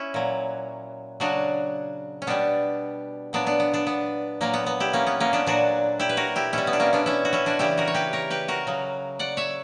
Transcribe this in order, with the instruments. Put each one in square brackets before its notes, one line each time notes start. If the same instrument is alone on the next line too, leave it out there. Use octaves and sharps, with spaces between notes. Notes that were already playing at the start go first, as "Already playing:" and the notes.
Already playing: [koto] C#4 E4
A#2 F#3
C#3 F#3 D4 F#4
C#4
B2 G3 B3 D4
A#2 F#3 B3 D4
B3 D4
B3
B3 D4
B3
A#2 F#3 A#3
B3
B3
E4 G4
A#3 C#4
B3
A#3 C#4
B3 D4
A#2 F#3 D4 F#4
E4 G4
B4
F#4 A#4
E4 G4
B2 G3 C#4 E4
B3
D4
A#3 C#4
B3 D4
C#4 E4
F#4
C#4 E4
D4 F#4
C#3 E3 G3 E4 G4
F#4 A#4
C#5
G4 B4
A#4 C#5
G4 B4
F#4 A#4
C#3 F#3
D5 F#5
C#5 E5